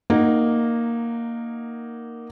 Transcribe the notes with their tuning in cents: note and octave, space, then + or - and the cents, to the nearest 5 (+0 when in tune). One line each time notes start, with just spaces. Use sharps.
A#3 +0 D#4 -15 F#5 +0